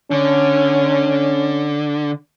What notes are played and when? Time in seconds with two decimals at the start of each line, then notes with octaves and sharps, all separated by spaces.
0.11 D3 C#4